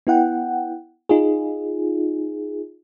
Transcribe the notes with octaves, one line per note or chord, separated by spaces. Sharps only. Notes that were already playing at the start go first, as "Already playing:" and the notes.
B3 E4 F#5 G5
D#4 F4 G#4